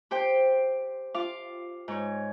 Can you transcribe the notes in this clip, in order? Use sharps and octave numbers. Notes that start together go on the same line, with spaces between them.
G4 C5 G5
F4 F5 D6
G#2 C#5